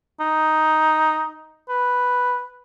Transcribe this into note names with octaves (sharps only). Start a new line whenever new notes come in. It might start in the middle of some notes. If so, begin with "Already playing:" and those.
D#4
B4